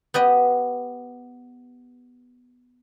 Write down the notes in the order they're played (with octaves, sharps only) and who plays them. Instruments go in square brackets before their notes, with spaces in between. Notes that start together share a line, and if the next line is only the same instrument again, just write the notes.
[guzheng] B3 G4 D#5